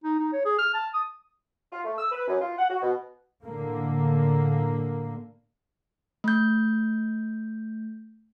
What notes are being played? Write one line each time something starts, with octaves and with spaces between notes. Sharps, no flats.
D#4
D#4
C#5
G#4
F6
A5
D#6
F4
A3
E6
B4
F#2
F4
F#5
F#4
B2
A2 D3 A#3
A3 G6